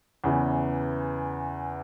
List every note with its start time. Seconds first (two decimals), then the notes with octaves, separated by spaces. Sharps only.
0.24 E2 C#3 E3